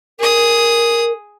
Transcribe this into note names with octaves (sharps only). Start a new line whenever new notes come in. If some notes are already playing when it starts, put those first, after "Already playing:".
G#4 A#4 D#6